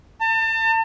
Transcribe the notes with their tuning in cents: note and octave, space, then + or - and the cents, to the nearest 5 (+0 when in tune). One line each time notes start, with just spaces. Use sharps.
A5 +35